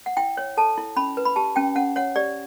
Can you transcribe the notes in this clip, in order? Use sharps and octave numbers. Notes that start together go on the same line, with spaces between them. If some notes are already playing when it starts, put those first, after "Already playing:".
F#5
E4 G5
C#5
A4 A5
E4
C#4 B5
B4
B5
G4 A5
C#4 G5
C#4 F#5
C#5 F#5
G4 D5